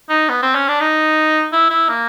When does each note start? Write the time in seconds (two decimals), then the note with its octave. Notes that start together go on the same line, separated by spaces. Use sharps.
0.09 D#4
0.29 B3
0.42 C4
0.55 C#4
0.68 D4
0.80 D#4
1.53 E4
1.70 E4
1.89 A#3